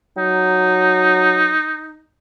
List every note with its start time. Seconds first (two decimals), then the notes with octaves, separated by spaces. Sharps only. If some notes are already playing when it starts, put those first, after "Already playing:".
0.18 F#3 D#4